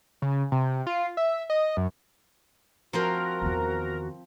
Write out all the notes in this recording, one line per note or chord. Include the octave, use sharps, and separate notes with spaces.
C#3
C3
F4
E5
D#5
F#2
F3 C4 F#4 A#4 C5 A#5
E2 D#3